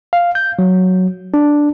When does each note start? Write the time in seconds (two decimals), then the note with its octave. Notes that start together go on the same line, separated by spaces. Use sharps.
0.13 F5
0.35 G6
0.59 F#3
1.34 D4